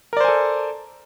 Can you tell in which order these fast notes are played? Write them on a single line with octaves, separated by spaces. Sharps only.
A#4 D5 C5 G#5 A4